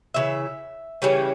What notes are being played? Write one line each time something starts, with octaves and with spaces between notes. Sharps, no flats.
C#3 E3 E5
C#3 E3 G3 C#4